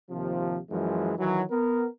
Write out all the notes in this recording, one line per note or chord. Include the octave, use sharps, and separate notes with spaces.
D#2 C3 F3
F#2 E3 F3 G#3
D#3 E3 F#3
B3 A#4